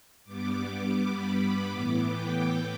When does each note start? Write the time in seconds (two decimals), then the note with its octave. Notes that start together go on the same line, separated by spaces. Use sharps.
0.25 G2 G3 B3 D6
0.98 B5
1.69 A2 E3 B3 D6
2.06 G5